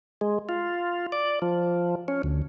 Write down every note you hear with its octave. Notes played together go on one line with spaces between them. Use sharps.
G#3
F4
D5
F3
C#4
D2